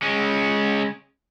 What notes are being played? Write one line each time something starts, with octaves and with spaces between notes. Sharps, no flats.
G#3 C#4